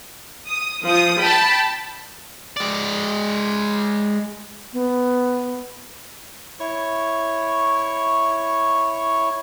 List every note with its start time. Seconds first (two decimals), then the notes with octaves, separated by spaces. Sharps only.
0.48 D#6
0.85 F3 D#6
1.21 G5 A5 B5
2.57 G#3 D5
4.73 B3
6.60 E4 C#5 C#6